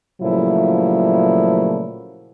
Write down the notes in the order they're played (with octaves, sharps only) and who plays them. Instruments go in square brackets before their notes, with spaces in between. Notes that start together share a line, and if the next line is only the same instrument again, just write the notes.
[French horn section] A#2 C#3 F3 F#3 A3 E4